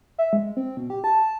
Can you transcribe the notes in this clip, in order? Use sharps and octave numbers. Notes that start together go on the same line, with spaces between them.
E5
G#3
C4
B2
G4
A5